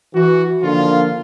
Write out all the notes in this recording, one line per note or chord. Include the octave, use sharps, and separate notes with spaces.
E3 F#4
D3 D#3 F3 A#3 F4